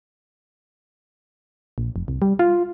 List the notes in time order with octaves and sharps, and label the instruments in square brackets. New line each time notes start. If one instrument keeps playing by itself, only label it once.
[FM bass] A#1
F1
C2
G3
F4